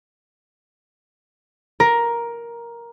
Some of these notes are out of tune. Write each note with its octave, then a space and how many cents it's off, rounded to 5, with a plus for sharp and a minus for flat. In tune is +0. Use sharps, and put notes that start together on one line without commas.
A#4 +10